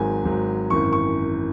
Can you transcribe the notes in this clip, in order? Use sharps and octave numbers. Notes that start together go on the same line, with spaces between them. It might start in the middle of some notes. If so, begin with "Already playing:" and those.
Already playing: G#1 G#2 F#3 G#5
G#1 G#2 F#3
G#1 F#2 E3 C#6
C#6